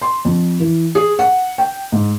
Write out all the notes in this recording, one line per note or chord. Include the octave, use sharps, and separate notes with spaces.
C6
F2
E3
G#4
F#5
G5
G#2